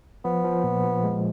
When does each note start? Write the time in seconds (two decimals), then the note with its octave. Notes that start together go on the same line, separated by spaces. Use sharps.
0.25 F3 B3
0.44 F3
0.64 A#2
0.83 F3
1.03 G#3